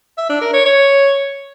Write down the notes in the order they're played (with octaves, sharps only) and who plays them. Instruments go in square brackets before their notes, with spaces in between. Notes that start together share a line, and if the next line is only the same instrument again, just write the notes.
[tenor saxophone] E5
D4
A#4
C#5
C#5